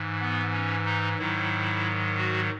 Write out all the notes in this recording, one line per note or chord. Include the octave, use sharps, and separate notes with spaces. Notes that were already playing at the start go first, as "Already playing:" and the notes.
Already playing: G#2 E3
B3
C#4
D#4
G#2 D#3 F#3 E4
F#4